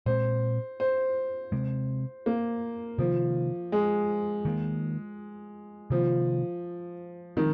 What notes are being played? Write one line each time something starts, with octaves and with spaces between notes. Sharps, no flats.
A#2 G#3 C4 C5
C5
C3 G#3 C4
A#3
C3 D#3 F3 A#3
G#3
D#3 A#3
C3 D#3 F3 A#3
D#3 F3 G#3 C4